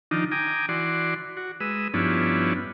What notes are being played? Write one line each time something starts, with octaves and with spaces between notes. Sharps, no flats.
D#3 F3 D4 D#4
G5 G#5 A#5 D6 D#6
E3 F#4 D5 C6
F#4
G#3 B4 D#6 E6
G2 F3 B3 C#4 D4 E4